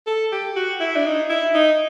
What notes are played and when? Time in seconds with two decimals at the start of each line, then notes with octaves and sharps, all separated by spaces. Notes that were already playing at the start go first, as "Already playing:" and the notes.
0.07 A4
0.32 G4
0.56 F#4
0.80 E4
0.96 D4
1.06 D#4
1.30 E4
1.54 D#4